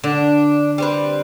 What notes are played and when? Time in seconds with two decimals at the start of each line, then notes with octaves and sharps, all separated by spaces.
0.04 D3 D4
0.78 G3 C4 B4